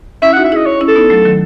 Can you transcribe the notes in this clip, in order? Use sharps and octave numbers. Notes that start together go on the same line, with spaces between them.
C#4 E4 E5
F#5
D#4 F#4
E5
E4 G#4
D#5
C#5
C#4 E4
A4
B3 D#4
F#3 A3
D#3 F#3